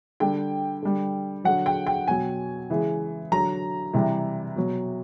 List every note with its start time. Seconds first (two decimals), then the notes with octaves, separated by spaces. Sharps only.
0.20 D3 G3 G5
0.82 D3 G3
1.44 D3 F#3 F#5
1.66 G5
1.87 G5
2.07 B2 F#3 G#5
2.70 C#3 E3 G#3
3.32 D3 F#3 A#5
3.93 C3 E3 G3
4.56 B2 F#3